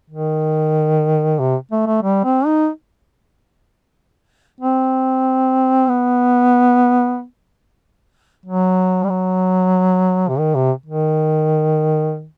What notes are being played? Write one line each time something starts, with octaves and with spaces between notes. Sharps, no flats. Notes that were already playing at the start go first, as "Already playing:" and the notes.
D#3
C3
A3
A3
G3
C4
D#4
C4
B3
F#3
G3
F#3
C3
D#3
C3
D#3